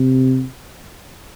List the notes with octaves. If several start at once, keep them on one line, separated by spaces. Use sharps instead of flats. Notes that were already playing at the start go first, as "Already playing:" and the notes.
Already playing: C3